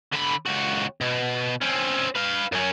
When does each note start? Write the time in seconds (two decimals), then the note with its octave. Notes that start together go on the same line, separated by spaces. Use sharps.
0.12 D3 B5
0.46 C#2 F#4
1.01 B2
1.61 C4 C#4
2.16 B4 F5
2.52 F#2 C#4